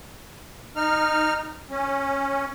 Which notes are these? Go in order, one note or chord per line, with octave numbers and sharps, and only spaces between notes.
D#4 F6
C#4